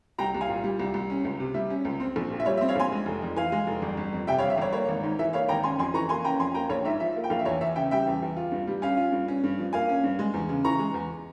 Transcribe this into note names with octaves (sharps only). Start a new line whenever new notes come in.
C2 G5 A#5
C2
F5 G#5
A#2
G3
C2
C2
C#4
C#2
C3
G3 E5
C#4
C#2
C4
A#1
A#2
E5
G3 C#5
E5
C4
C#5 F5
A#1 G#5 C6
G#3
F1
F2
E3 F5 G#5
G#3
F1
G1
G1
F2
C3 E5 G5
C#5 F5
G1
E5
G1 C#5
A#3 C#5
G#1
G#2
E3 E5
A#3 C#5 F5
G#1 G5 A#5
C#4 G#5 C6
F2 G#5 C6
E3 A#5 C#6
A#3 G#5 C6
C#4 G5 A#5
F2 G#5 C6
A#3 G5 A#5
A#1 C#5
G#2 E5
F3 E5
A#3
G5
A#1 F5
E5
E2 C#5
E2 E5
C#3 E5 G5
G3 E5 G5
E2
E2
F4
G2
G3
C#4 F5 G#5
F4
G2
C#4
G2
F3
A#3 F5 G#5
C#4
G2
G#3
E2
C#3
E3 A#5 C#6
G#3
E2